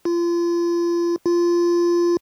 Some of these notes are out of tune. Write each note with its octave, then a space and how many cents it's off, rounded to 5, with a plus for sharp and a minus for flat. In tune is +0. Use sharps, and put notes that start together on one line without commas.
F4 -30
F4 -15